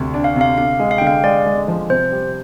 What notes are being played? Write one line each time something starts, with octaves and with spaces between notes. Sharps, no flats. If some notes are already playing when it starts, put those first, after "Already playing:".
Already playing: D2 C3
D4
F5
C3 F5
D3 F5
G#3
F5
G5
D3
F5
G#3 D5
G#3
F3
C3 C5
G3